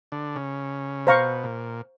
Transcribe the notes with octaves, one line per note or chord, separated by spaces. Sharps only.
D3
C#3
B2 C5 F5 A#5 C#6
A#2